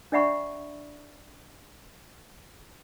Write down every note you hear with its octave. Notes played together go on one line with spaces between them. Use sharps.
D4 D5 E5 F#5 B5 C#6